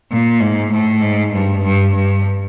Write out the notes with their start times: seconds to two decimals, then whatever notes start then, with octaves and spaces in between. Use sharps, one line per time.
0.11 A#2
0.41 G#2
0.72 A2
1.02 G#2
1.33 G2
1.64 G2
1.94 G2